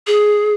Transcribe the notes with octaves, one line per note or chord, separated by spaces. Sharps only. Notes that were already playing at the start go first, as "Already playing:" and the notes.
G#4